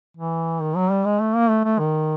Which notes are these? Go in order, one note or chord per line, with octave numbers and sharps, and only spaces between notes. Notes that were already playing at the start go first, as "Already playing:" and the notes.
E3
D#3
F#3
G3
G#3
A3
A#3
A3
A3
D#3